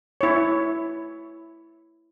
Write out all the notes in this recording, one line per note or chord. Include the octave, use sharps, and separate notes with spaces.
E4 C#5